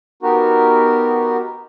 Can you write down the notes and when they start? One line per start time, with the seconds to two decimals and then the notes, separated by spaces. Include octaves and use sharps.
0.23 B3 D#4 F#4 G4 A#4